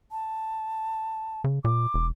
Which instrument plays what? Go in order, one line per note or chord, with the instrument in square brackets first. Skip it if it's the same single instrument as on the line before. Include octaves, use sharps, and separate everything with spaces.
[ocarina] A5
[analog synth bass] C#3
[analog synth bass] A#2 [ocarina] D6
[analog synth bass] E1